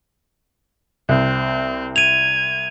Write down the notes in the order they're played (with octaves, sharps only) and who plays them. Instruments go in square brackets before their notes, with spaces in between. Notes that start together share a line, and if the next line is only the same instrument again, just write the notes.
[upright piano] C2 [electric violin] C4
[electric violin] G#6 [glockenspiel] D#7 F7